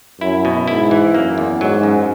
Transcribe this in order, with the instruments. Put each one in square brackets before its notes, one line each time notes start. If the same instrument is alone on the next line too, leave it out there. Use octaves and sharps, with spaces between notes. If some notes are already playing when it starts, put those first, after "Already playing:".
[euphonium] F#2 [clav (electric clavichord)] E4
[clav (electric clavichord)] B2
[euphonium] G#2 [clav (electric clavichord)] E4
[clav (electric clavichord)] E3
[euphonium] F#2 [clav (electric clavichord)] A#3
[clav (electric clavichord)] E2
[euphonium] G#2 [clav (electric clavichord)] F#3
[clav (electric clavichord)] F#2